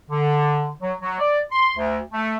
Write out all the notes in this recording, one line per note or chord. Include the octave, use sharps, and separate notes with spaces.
D3
F#3
F#3
D5
C6
D2
A3